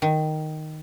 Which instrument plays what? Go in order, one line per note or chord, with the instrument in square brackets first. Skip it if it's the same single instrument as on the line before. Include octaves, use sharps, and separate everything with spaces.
[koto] D#3